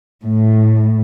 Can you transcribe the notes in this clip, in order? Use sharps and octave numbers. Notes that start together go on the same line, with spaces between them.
A2